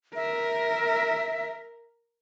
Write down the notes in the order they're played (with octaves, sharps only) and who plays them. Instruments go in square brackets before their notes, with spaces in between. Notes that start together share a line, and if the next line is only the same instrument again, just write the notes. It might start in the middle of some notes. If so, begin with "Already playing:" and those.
[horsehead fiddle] A#4 [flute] E5